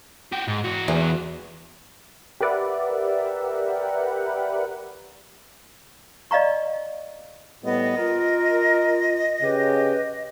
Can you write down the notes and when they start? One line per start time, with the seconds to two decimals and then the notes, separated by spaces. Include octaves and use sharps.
0.32 F#4 G4
0.48 G#2
0.64 E3 F#4
0.88 E2
2.41 G4 A#4 B4 D5 E5 F#5
6.31 D5 D#5 F5 A#5 C#6
7.64 A2 G3 B3 D#5
7.97 F4 A#4
9.43 C#3 G4 B4